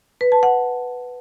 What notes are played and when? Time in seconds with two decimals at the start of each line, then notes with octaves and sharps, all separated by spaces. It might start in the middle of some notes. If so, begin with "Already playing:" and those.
0.21 B4
0.32 A5
0.43 F#5